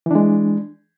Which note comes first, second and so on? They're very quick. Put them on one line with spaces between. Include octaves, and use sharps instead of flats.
E3 D4 G#3